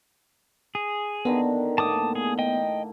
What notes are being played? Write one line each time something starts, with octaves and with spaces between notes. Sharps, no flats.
G#4
D3 D#3 B3 A#5
A2 A#3 A5 D6 D#6
G#4
D#5 G5